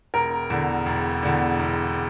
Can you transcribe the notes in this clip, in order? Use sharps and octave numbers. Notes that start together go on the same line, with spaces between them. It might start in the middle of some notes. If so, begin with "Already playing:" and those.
E1 A#4
E2 D3
E1
E2 D3
E1